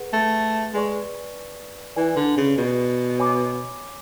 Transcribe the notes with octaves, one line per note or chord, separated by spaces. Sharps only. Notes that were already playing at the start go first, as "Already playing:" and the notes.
Already playing: G#4 B4 F#5
A3
G#3 B4 D5 G#5 C#6
E3 B4 D5 G#5
D3
C#3
B2
C#5 G#5 B5 D6